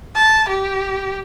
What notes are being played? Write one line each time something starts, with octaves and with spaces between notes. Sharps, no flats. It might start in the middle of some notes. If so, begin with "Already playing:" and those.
A5
G4